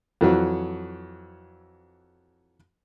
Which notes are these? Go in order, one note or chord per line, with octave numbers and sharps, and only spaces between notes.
F2 E3 F#3